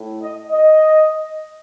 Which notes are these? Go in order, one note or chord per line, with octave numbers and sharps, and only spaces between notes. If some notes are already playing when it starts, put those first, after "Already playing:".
Already playing: A2
D#5
D#5